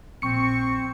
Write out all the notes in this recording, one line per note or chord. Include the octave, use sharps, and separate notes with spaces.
A#1 C4 C#6 C#7